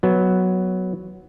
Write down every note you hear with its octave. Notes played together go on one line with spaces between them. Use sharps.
F#3 B3